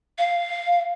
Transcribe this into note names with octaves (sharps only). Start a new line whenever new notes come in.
F5